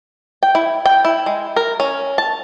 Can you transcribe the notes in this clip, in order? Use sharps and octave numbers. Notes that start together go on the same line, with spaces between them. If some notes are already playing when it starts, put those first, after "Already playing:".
G5
E4
G5
E4
G#3
A#4
C#4
A5